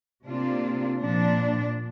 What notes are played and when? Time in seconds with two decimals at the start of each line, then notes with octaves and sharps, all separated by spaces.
0.26 C3 A#3 D4 F4
1.00 A#2 F3 D4